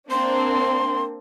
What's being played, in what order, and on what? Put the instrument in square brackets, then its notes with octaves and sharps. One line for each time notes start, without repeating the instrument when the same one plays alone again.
[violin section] A#3 C4 D4 [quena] C6